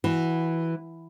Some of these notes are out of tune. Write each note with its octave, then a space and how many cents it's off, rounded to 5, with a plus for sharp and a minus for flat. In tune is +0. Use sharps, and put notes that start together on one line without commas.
E3 +0 F#4 +0